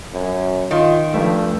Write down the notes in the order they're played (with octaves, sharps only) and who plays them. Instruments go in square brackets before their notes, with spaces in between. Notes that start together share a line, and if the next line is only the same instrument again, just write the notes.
[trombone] F#2
[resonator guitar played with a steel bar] D#3 [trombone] F4
[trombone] G2 [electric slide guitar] F3 A3